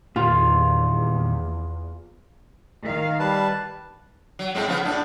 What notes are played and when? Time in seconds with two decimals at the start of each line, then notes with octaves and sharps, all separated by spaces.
0.16 E2 A#2 D#3 F4
2.81 D#3 F5
3.19 G3 B4 A5
4.39 F#3
4.55 A2 G#3 C4
4.66 C#3 F3 B3
4.84 A2 D4